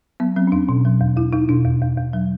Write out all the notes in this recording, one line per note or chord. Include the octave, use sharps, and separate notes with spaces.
F#3 B3
F#3 C4
C#4
E2 D4
B2
F#3
E2
E2 E4
E2 D#4
B2 D4
E2
E2
E2
F#3